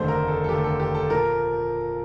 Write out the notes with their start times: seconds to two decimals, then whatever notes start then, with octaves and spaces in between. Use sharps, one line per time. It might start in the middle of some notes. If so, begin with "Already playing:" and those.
Already playing: F1 D#2 D3 A3 C5
0.08 A#4
0.28 A4
0.44 A4
0.49 F1 D#2 D3 A3 G4
0.64 A4
0.80 G4
0.95 A4
1.10 A#2 F3 A#4